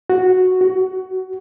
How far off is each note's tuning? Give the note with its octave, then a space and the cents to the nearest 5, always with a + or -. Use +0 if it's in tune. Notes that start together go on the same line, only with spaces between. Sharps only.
F#4 -5
F#4 +20